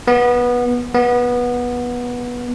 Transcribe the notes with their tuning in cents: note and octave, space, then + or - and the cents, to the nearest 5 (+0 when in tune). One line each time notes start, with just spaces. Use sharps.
B3 -15
B3 -15